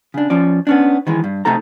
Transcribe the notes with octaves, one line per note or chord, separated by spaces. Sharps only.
C#3 D4
F3 C#4 D5
B3 C#4 D4
D#3 E3 G#3
G2
C3 A3 D#4 A4 A#5